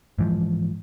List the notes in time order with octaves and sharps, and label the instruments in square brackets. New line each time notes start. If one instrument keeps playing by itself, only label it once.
[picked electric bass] G#2 E3 F3